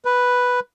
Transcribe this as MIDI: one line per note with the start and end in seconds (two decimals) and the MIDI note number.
0.05 0.60 71